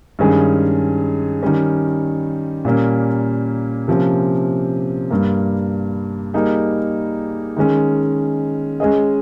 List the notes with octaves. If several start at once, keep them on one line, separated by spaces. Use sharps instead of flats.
G2 D#3 G#3 C#4 G#4
D#3 G3 C#4
A#2 G3 A#3 C#4
C3 F3 A#3 C#4
G2 G3 A#3
G3 A#3 D#4 G#4
D#3 G#3 C#4
G#3 C#4 G#4 D#5